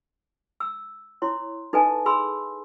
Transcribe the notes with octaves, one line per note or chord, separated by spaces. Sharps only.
E6
E4 C#5 C6
D#4 A4 B4 D#5 G#5 A5
G#4 B5 C6 E6